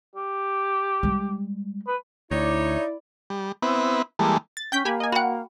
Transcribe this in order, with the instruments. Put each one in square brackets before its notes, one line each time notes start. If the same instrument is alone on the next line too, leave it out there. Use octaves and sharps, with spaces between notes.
[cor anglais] G4
[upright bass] G3 G#3
[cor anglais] B4
[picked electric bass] D2 [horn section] D#4 C#5 [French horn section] E4 [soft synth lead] D5
[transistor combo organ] G3
B3 C4 E4 B4
E3 G3 G#3 A#3 A4
[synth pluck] A6
[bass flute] C#4 [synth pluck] G5 G6 B6
[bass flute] A#3 [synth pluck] G4 G#5 B5
[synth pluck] D#5 G#5
[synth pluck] F#4 F#5 [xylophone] G5 B5